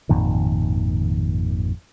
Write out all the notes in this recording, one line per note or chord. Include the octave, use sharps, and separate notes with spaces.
G#1 F2 A#2 D#3